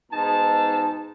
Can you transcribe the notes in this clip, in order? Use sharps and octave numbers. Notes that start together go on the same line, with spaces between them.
G#2 B2 D#4 A5